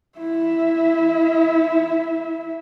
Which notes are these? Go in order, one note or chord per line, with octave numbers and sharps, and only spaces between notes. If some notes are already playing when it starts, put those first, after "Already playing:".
E4 E5